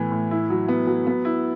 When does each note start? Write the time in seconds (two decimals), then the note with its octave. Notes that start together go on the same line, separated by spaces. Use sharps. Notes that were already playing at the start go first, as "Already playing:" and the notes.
Already playing: A2 E3 B3
0.12 A2
0.31 E4
0.50 F#3
0.68 B3
0.87 F#3
1.07 B3
1.25 E4